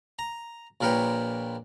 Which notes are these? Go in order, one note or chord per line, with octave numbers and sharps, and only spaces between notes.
A#5
A#1 A#2 A#4 B4 C#5 G5